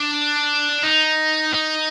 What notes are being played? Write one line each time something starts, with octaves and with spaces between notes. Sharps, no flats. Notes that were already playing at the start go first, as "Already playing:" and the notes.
Already playing: D4
D#4
D#4